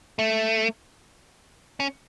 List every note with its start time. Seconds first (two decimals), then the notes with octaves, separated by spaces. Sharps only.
0.19 A3
1.80 C#4